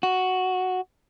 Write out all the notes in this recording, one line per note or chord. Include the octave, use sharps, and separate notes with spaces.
F#4